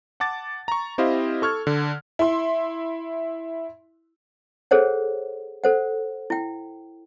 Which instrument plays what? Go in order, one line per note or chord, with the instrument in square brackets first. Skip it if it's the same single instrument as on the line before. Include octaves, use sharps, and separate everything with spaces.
[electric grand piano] F#5 A5 D6 A6
A#5 C#6
C4 E4 G4 C5 D#5 F5
A4 C#6 F6 G#6
D3
[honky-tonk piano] E4 C6
[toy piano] G#4 A4 C5 C#5 F#5
A4 C5 F#5
E4 G5